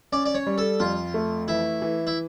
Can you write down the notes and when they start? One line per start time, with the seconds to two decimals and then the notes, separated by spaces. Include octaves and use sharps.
0.12 C#4 D5
0.25 D5
0.35 C#5
0.47 G3
0.58 A4
0.80 F2 F4
1.14 A3
1.48 E3 E4
1.82 E3
2.07 E4